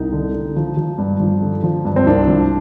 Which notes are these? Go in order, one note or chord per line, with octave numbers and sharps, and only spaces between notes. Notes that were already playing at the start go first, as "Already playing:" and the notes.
Already playing: C2 D#4
D3
D3
F3
F3
G2
F3
D3
F3
G2
C4
C2 D4
F3